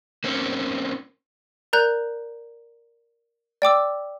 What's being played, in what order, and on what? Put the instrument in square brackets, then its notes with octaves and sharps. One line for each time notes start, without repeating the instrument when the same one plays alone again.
[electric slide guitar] A#3 C4 C#4
[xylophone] A#4 D5 A#5 F#6 G6
D5 G5 D6 E6